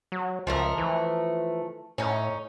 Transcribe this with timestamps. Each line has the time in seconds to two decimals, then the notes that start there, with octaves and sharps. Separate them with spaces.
0.12 F#3
0.47 C#2 F3 A3 A#4
0.78 E3
1.98 A2 C#4 D#4